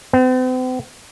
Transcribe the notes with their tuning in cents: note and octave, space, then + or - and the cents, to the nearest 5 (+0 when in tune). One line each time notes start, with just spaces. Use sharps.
C4 -45